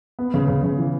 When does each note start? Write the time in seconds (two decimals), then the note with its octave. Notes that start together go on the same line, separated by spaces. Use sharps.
0.19 B3
0.34 C#3
0.48 C#3
0.64 C#3
0.78 E3